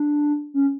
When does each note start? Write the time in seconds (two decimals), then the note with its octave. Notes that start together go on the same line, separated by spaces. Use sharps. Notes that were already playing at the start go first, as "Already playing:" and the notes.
Already playing: D4
0.54 C#4